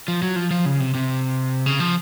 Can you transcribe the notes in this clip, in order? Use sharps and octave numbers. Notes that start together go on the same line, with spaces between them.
F3
F#3
F3
F3
C#3
C3
C3
C#3
F3